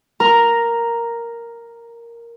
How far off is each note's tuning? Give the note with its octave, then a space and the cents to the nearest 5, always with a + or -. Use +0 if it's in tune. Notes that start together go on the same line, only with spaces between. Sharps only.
A#4 +0 A#5 +0